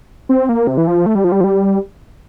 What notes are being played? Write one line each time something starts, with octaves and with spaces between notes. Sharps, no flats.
C4
A#3
C3
E3
F3
A3
G3
F3
G3
F3
G3